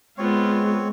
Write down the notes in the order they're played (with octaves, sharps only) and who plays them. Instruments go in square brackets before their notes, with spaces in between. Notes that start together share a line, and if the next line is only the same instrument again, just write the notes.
[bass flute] G#3 [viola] B3 F4 [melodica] C4 C#5